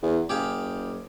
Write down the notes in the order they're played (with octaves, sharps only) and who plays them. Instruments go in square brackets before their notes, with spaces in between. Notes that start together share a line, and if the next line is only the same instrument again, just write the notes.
[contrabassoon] E2
[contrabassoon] F#1 [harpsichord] G4 G#4 F5